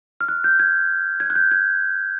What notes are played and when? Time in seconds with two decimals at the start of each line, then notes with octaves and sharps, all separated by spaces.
0.21 F6
0.28 F#6
0.44 G6
0.60 G#6
1.20 G#6
1.30 F#6
1.36 G6
1.51 G#6